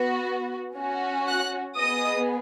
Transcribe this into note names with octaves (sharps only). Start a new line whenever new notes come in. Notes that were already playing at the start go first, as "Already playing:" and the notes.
Already playing: B3 F#4
C#4 F#4
F#5 F#6
B3 G#4 D#5 D#6